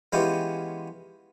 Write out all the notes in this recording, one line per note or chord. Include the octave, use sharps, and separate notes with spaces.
E3 G#3 B3 C#4 F4 G4